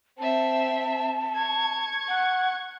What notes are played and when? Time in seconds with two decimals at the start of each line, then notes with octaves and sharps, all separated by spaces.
0.19 C4 E5 A5
1.36 C#6 G#6
2.09 F#5